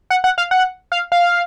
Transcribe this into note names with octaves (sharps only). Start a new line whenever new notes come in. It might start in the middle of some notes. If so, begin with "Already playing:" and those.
F#5
F#5
F5
F#5
F5
F5